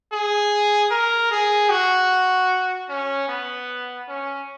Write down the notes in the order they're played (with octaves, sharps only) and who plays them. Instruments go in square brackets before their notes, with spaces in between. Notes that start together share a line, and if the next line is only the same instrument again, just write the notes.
[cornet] G#4
A#4
G#4
F#4
C#4
B3
C#4